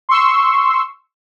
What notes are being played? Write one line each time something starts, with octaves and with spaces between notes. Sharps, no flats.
C6 C#6 E6